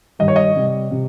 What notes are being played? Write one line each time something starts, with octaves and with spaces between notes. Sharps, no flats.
G2 D#3 G3 D#5
C#5
D#5
C3 G3
C3